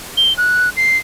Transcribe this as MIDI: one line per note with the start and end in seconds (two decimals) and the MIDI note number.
0.17 0.34 103
0.38 0.70 90
0.77 0.97 96